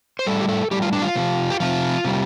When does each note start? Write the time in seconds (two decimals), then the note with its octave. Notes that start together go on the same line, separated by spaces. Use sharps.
0.19 C5
0.27 A2 G3 A4
0.41 G4
0.49 A4
0.71 A2 G3 G4
0.82 F4
0.93 D4
1.02 F4
1.15 C3 F3
1.50 G4
1.60 C3 F3 F4
2.05 C3 G3